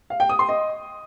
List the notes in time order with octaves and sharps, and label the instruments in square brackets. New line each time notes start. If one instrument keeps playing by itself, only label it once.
[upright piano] F5
G5
D#6
C6
D#5